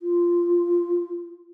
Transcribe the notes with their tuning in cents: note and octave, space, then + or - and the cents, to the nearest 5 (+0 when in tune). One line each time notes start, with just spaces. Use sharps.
F4 -10